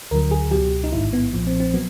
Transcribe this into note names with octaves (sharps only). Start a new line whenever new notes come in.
D2 D3 F#3 A#4
G#4
C#2 B2 F#3 G4
D#4
A1 G#2 D#3 E4
B3
B1 A#2 F3
C4
C4
F#3 B3